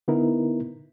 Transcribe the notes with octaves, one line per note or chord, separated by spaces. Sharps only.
D3 B3 D#4 E4 A#4